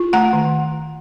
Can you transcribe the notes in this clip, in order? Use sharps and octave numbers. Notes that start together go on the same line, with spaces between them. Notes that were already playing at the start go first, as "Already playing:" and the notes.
Already playing: F4
A3 F#5 A#5
D#3